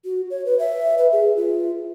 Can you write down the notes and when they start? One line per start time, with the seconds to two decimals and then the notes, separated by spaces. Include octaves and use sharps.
0.05 F#4
0.30 C#5
0.46 B4
0.59 E5
0.98 B4
1.12 G#4
1.36 F4